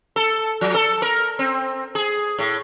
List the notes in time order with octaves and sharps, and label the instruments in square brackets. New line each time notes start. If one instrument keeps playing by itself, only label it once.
[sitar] A4
F3
A4
A#4
C4
G#4
A2